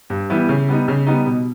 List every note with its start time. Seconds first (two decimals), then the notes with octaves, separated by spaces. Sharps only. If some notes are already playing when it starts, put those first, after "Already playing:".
0.10 G2
0.30 E3 G3 B3 E4
0.49 C#3
0.69 G3 B3 D#4
0.88 C#3
1.07 G3 B3 D#4
1.26 B2